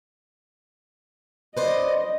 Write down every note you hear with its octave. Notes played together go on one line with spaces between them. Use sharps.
B4 C5 D5 D#5